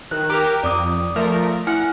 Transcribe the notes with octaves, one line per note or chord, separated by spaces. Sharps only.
D#3 F#6
G4 A#4 A#5
F2 D5 D6 D#6
F3 A3 A#4
E4 F#5 G#5 F6